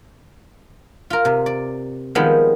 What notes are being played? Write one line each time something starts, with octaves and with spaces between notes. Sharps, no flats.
F4 A#4
C3
D5
D#3 F3 G3 G#3 B3 C4